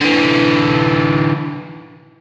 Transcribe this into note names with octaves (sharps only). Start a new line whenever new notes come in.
D3 E3